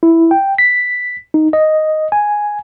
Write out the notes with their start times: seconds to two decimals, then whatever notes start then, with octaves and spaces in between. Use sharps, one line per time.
0.03 E4
0.31 G5
0.58 B6
1.34 D#4
1.53 D#5
2.12 G#5